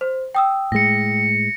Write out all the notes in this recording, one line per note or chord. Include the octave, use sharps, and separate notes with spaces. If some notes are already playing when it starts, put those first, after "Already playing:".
C5
G5 D#6 E6
A2 G#3 A#6 C#7